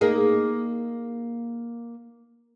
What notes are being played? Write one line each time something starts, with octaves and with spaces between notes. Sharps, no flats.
A#3 D#4 G#4